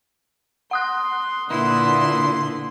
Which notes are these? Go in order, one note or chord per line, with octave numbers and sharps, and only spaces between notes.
F#5 C6 D#6 F#6
A#2 D3 E4 B4 C6